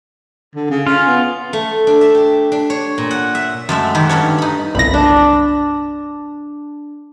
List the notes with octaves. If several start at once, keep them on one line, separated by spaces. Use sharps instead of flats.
D3
C#3
C#4 F4
B3
A3
D4
E5
G4
D4
C#5
A#2
F#5
E5
F#2 G#3 A3 E5
D#3 F#4 G4 B4
G2 C#4 D4 C#5
D#4 B5
G1 C2 B5 A#6
D4